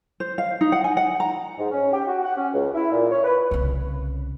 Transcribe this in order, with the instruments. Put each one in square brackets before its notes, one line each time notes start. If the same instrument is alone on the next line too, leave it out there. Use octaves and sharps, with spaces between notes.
[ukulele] C5
F5
D#4
F#5
G#5
F#5
A#5
[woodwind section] G#2
C#4
G4
F#4
F#5
C#4
C#2
E4
A#2
C#5
B4
[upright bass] C2 C#3